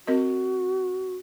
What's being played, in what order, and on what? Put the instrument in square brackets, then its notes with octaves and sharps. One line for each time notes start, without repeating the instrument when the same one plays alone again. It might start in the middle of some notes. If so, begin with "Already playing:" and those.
[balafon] C4 A#4 D#5 [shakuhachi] F#4